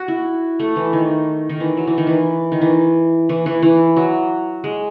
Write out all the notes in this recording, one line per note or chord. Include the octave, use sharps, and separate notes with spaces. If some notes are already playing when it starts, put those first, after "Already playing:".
Already playing: F#4
E4
A3
E3
D#3
D#3
E3
F#3
E3
D#3
E3
D#3
E3
E3
E3
E3
F#3
G#3